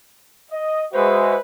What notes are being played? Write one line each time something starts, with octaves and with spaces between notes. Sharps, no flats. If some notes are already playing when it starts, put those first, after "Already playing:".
D#5
G#3 F#4 B4 C5 E5